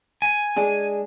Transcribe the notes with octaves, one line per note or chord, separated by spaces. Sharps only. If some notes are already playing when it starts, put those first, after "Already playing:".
G#5
G#3 D4 G#4